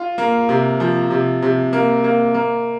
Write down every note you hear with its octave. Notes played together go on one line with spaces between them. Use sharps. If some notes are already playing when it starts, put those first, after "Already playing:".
Already playing: F4
A#3
C3
F3
C3
C3
A#3
A#3
A#3